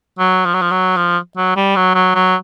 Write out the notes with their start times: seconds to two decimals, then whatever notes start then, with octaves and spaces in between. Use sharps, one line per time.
0.19 F#3
0.46 F3
0.54 F#3
0.61 F3
0.71 F#3
0.97 F3
1.37 F#3
1.56 G3
1.76 F#3
1.94 F#3
2.15 F#3